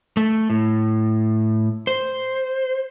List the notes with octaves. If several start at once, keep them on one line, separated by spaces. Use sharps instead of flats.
A3
A2
C5